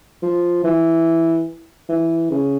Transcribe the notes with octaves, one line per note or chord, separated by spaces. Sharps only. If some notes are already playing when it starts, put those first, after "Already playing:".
F3
E3
E3
C#3